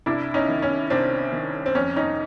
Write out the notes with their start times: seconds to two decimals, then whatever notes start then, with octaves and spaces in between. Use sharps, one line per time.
0.06 C2 D4 E4
0.34 C#4 D#4
0.49 D#3
0.62 C#4
0.90 C2 C4 D4
1.32 D#3
1.66 C4
1.75 F2 C#4
1.96 C#4 D#4